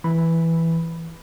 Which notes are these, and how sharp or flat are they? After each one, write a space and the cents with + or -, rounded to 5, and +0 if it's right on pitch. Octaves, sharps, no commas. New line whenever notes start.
E3 +0 B5 +0